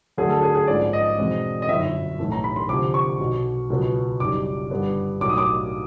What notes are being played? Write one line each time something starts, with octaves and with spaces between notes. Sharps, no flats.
D2 D3 F#3 A3 G#4
A4
G#4
G#4
A#1 G#2 F3 A#3 C#4 D5
D#5
E2 B2 G#3 C4
D#5
G1 F#2 D#3 E5
B1 A2 E3 A3
A#5
B5
C6
D2 C3 F3 D6
C#6
B1 B2 F#3
C#2 B2 F#3 B3
F#1 F#2 D#3 G3 D6
G2 D3 G3 B3
B1 A2 F#3 A#3 D6
D#6
D6